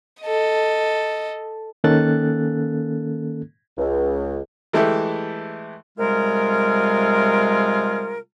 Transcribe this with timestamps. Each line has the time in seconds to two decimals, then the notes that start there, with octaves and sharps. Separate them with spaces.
0.21 A4 D#5
1.84 D#3 A#3 C#4 A4 F#6 A6
3.78 C#2
4.73 E3 G#3 A3 E4 G4 A4
5.98 C3 G3 G#3 F4 G#4 A#4